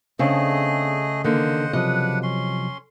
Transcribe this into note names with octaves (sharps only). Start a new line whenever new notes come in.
C#3 A3 C4 D4 G#4 D#5
D3 D#3 A#3 C5 D#5 F#5
C3 F3 F#3 D4 B4 D#5 F#5
C#4 C6